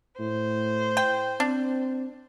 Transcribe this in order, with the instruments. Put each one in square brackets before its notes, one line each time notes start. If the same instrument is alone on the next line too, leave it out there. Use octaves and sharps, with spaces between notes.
[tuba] A2 [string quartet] C5
[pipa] G5
[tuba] C4 [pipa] D4